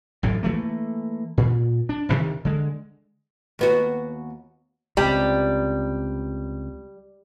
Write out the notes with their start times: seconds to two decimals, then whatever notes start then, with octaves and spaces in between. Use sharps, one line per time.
0.23 A1 F#2 A2
0.43 E3 F3 A3 A#3
1.37 A#2
1.89 D4
2.09 A1 D2 C3 D#3
2.45 D3 G#3
3.59 D#2 B3 F#4
4.97 C#2 C3 G3